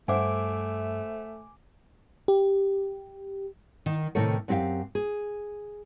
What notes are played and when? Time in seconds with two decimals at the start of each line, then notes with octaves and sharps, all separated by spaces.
0.08 G2 A3 C5 E5 F#5 G#5 D6
2.28 G4
3.86 D#3
4.15 A2 C3 D#3 D#4 A4 C#5
4.48 F#2 C4 G4 G#4 F5
4.95 G#4